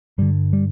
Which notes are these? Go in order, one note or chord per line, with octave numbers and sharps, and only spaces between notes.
G2 D3 G3
G3